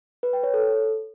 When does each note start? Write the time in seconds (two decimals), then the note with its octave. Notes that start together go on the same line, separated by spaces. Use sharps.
0.23 B4
0.33 G5
0.43 C#5
0.54 A4